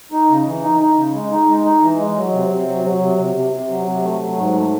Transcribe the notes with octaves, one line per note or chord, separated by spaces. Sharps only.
D#4
C#3
E3
D#4
D#4
C#3
G#3
D#4
G#3
D#4
E3
G#3
F#3
C3
C3
F#3
F#3
C3
C3
C3
C3
F#3
C3
A3
F#3
G#2
A3